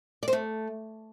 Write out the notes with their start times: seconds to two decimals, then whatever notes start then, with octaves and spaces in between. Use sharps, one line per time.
0.23 D5
0.28 C5
0.33 A3